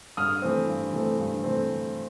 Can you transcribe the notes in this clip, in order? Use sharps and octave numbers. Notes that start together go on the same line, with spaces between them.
G2 D#6 F6
E3 A3 C4
G2
E3 A3 C4
G2
E3 A3 C4